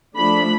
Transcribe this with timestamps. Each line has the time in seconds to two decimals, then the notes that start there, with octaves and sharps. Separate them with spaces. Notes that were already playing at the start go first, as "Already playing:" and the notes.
0.17 F3 A3 D4 B5